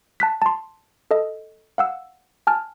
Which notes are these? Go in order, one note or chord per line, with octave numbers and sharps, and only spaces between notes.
A5 F#6 B6
A5 C6
A4 D#5
F5 F#5 E6
G#5 A5 F6